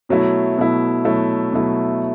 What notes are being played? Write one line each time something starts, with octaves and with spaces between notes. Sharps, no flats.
B2 F#3 A3 E4
B2 F#3 A3 E4
B2 F#3 A3 E4
B2 F#3 A3 E4